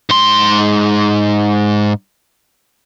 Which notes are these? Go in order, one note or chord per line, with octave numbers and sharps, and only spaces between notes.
G#2 C6